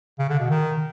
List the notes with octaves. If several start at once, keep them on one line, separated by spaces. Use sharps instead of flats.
C#3
D3
B2
D#3